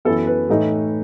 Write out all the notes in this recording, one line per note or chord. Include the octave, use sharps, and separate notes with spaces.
F#2 E3 B3 E4 A4
B4
A2 E3 A3 D#4